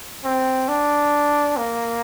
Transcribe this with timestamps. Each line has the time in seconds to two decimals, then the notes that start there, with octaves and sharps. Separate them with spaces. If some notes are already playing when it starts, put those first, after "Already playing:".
0.24 C4
0.69 D4
1.57 A#3